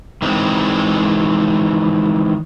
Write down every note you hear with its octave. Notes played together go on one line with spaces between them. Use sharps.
D#3 E3 G#3 C4